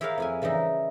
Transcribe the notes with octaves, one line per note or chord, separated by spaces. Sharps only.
E4 G4 G#4 A#4 C#5 F5
F2 E4 G#5
C#3 E3 G3 D#4 E4